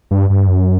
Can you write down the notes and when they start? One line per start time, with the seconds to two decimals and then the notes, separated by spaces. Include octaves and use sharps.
0.11 G2
0.30 G2
0.47 F#2